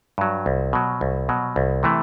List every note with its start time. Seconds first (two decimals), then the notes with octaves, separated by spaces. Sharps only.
0.18 G2 F#3
0.46 C2
0.73 B2 F#3
1.01 C2
1.29 B2 F#3
1.56 C2
1.83 C3 E3 A3